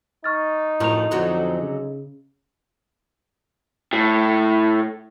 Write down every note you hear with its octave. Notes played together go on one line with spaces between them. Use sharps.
D#4 C#6 F6 A6
F1 F#2 A2 F3 E4 A#5 F7
F2 D3 F#3 C#4
C#3
A2